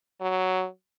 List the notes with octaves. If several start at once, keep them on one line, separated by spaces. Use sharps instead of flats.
F#3